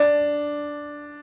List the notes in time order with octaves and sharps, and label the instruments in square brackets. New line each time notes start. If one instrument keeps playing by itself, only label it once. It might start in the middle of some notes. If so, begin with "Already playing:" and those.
Already playing: [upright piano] D4